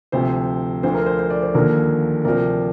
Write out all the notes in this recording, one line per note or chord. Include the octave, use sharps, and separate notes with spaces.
D2 C3 F3 C5
D2 D3 F3 C5
A#4
C5
C5
D5
C5
D#2 D3 F3 A#4
D2 C3 F3 A#4 D5